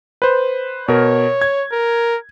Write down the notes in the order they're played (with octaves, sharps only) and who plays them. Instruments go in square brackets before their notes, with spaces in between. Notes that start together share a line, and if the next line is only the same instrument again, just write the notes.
[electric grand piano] B4 C5
[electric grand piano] B2 A#4 [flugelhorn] C#5
[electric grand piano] G#6
[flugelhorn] A#4